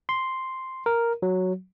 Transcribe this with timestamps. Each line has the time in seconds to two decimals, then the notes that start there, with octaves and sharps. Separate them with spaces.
0.09 C6
0.86 A#4
1.22 F#3